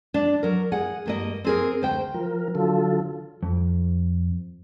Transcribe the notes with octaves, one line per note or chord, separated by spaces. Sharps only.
D4
F#3 A#4
G#4 F#5
G2 A#3 D#5
C4 G#4 A#4
D2 C5 G5
F3 A#4
D3 F#3 F4 A4
F2